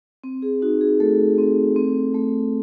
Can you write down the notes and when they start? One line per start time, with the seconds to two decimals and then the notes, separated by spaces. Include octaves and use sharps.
0.24 C4
0.42 G#4
0.62 D#4 F#4
0.81 G#4
1.00 A3 A4
1.38 C4
1.76 C4
2.14 A3